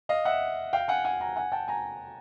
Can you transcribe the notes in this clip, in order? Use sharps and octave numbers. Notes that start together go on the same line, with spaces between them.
D#5 F5
E5 F#5
F5 G5
F#5 G#5
F#5 G#5
G#5 A#5
F#5 G#5
G5 A5
G#5 A#5